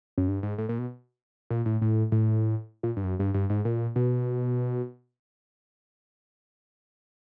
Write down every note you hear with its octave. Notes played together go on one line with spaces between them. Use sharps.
F#2
G2
G#2
A2
A#2
B2
A#2
A2
A2
A2
A#2
G2
F#2
G2
G2
G#2
A#2
B2